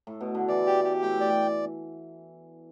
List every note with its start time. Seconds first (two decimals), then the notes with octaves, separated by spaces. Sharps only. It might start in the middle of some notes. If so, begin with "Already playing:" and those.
0.07 A2
0.21 B2
0.35 D3
0.48 E3 D5
0.66 G4
0.84 G4
1.02 A2 G5
1.20 D5